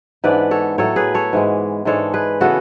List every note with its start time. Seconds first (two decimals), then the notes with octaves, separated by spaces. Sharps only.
0.24 G#2 E3 B3 D4 B4 D5
0.51 A4 C#5
0.78 A2 F#3 A3 A4 C#5
0.96 G#4 B4
1.14 A4 C#5
1.33 G#2 E3 G#3
1.85 G#2 E3 G#3 D4 A4 C#5
2.14 G#4 B4
2.40 C#3 E3 B3 F#4 A4